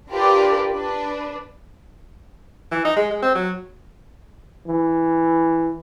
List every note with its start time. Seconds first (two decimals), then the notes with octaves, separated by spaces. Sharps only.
0.10 D4 F4 G4 A#4 B4 D5
0.73 D4 B4
2.72 E3
2.85 D#4
2.96 G#3
3.10 G#3
3.22 C4
3.35 F#3
4.66 E3